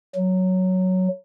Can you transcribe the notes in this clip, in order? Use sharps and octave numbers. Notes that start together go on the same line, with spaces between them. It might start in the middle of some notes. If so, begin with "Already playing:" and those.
F#3